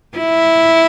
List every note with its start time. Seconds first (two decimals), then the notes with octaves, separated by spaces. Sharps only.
0.18 E4